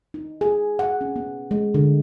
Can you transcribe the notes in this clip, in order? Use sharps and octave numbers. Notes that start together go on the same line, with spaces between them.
D#4
G#4
F#5
C#4
B3
G#3
D3